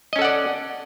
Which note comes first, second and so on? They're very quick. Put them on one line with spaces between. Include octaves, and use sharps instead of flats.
D#5 C#4 A4 F#5 D5